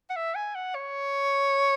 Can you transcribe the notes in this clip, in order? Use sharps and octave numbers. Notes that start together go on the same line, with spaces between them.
F#5
E5
G#5
F#5
C#5